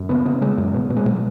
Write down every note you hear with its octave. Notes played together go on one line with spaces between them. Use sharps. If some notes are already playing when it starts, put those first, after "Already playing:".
Already playing: F#2
C#3 B3
C#3 B3
C#3 G#3
F#2
B2
B2
G#3
B2 F#3